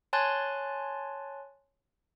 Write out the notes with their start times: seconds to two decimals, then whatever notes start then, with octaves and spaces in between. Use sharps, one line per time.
0.13 C#5 G#5 A5 C6 F#6 A6